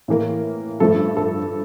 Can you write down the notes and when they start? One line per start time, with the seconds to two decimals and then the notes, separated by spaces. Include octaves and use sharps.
0.08 A2 E3 A#3
0.80 G2 F3 A3 A4
1.17 A4